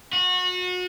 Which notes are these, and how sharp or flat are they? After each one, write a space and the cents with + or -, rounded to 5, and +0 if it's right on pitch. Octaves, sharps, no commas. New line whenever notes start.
F#4 -30